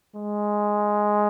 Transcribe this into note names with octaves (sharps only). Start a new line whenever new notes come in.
G#3